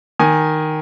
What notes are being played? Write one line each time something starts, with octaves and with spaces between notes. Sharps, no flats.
D#3 G#5